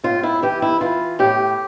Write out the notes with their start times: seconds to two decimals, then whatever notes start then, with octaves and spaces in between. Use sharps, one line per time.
0.03 A2 F4
0.23 E4
0.43 E3 G4
0.62 E4
0.81 E3 F4
1.19 A2 G4